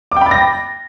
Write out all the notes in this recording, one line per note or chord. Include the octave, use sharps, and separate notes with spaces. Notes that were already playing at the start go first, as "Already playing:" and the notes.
G5 B5 D6 A6 A#6